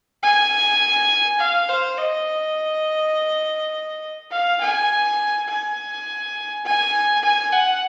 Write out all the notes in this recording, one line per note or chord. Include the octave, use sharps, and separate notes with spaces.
G#5
F5
C5
D#5
F5
G#5
G#5
G#5
G#5
F#5